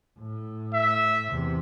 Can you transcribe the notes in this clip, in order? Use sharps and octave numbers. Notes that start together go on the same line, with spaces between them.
A2
E5
E2 C3